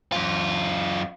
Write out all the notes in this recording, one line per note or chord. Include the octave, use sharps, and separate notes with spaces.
F#2 F4